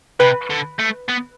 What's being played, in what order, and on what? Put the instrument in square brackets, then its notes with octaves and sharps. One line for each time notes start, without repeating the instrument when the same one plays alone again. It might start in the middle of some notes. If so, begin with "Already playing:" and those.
[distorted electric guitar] C3 [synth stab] B4
[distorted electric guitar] D3
A3
B3